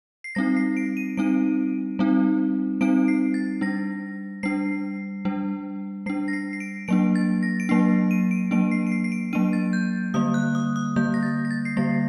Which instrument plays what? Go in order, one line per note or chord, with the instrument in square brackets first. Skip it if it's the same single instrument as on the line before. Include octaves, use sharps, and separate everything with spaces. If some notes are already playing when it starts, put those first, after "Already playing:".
[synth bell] C7
G3 C4 D#4 A#6
C7
D7
D#7
G3 C4 D#4 D7
G3 C4 D#4
G3 C4 D#4 D7
C7
A6
G3 D4 A#6
G3 D4 C7
G3 D4
G3 D4 C7
A#6
C7
C7
D7
F#3 A#3 D4 D7
A6
A#6
D7
F#3 A#3 D4 C7
D#7
D7
F#3 A#3 D4 D7
C7
D7
C7
C7
D7
F#3 A#3 D4 D#7
A6
G6
D3 G3 A#3 D#6
F#6
D#6
D#6
D3 G3 A#3 G6
A#6
A6
A#6
A6
C7
D3 G3 A#3 A#6